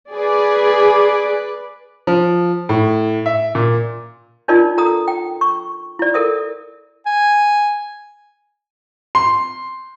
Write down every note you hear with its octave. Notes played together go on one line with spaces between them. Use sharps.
G#4 B4 D5
F3
A2
E5
A#2
D4 D#4 F4 A#4 D5 D#5
A4 A#5 D#6
G5
C#6
E4 D5
A4 A#4 E5 D#6
G#5
C6